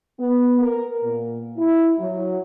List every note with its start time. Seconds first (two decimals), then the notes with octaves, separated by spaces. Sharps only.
0.20 B3
0.61 A#4
1.03 A#2
1.58 E4
1.99 F#3